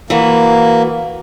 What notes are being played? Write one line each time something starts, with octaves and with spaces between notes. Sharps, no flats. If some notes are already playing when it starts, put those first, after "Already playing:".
E3 A#3 F#4